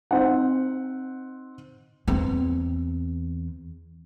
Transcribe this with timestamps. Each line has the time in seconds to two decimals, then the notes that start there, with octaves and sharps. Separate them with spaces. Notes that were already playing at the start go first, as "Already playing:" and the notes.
0.11 C4 D#4 F#5
2.08 E2 C4